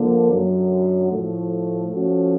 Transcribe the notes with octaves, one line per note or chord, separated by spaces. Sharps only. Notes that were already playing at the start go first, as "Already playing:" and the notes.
Already playing: D3 F3 A#3
F#2 D3 F#3
A2 F3 A3
F3 A3 C#4 F#4